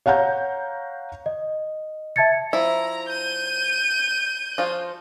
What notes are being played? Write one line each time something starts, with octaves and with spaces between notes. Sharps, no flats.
C#5 F5 F#5 A#5 G6
D#5
E5 A5 G#6 A6 C#7
F3 E4 A#5
G6 D#7
F3 F4 F#4